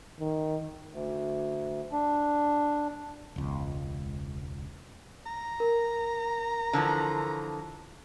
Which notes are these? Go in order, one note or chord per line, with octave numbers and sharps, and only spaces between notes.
D#3
D2
D4
E1 C#2
A#5
A#4
D3 E3 F3